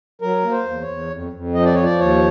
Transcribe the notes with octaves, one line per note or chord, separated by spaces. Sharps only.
F#3 A#4
A#3
C5
E2
C#5
E2
F2
F2
F3 D#5
D5
F3 C#5
D5
D#2 C#5